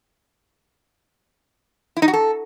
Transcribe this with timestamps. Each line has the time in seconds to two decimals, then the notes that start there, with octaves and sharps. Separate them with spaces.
1.97 E4
2.02 D#4
2.08 F#4
2.13 A4